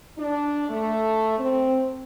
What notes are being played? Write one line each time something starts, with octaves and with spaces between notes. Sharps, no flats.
D4
A3
C4